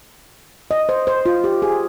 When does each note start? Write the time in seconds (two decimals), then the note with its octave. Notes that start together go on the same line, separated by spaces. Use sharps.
0.71 D#5
0.89 C5
1.07 C5
1.26 F4
1.44 G4
1.62 G#4